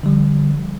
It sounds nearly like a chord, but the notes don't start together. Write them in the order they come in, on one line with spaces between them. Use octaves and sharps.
D3 G3 F3